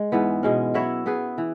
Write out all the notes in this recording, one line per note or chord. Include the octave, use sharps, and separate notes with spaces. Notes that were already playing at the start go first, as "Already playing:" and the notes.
Already playing: G#3
G#2 E3 B3
B2 G#3 C#4
F#3 E4 C#5 E5
B3 G#4 B4
E3